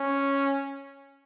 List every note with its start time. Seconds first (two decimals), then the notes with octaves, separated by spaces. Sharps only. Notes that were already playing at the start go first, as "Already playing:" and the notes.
Already playing: C#4